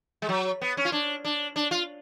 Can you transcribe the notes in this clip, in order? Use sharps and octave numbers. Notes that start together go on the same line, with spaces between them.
G#3
F#3
B3
C#4
F4
D4
D4
D4
F4